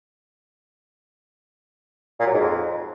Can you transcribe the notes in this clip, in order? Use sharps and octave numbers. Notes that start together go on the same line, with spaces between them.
A#2
F#3
G#2
F2